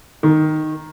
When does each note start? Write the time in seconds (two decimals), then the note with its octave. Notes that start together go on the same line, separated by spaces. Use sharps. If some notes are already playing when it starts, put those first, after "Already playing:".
0.23 D#3